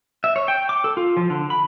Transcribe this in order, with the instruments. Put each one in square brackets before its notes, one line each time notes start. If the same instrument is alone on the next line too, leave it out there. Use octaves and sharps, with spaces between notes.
[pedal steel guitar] E5
C#5
G5
D6
A4
F4
F3
D3
B5